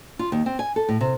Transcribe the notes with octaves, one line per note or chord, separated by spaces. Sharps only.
F4
D#2
C4
G#5
A4
A2
C3